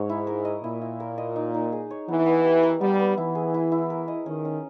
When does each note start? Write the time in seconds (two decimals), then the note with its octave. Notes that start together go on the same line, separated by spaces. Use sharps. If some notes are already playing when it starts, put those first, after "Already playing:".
Already playing: G#2 C#5
0.09 E4
0.27 A#4
0.45 D#5
0.64 A#2 E4
0.82 E4
1.00 A#4
1.18 D#5
1.36 D#4
1.54 D#4
1.72 G#4
1.91 C#5
2.08 E3 B3
2.26 B3
2.45 G4
2.63 A#4
2.81 G3 B3
2.99 B3
3.17 E3 E4
3.35 G#4
3.54 E4
3.72 E4
3.90 A#4
4.08 D#5
4.26 D#3 C#4
4.45 C#4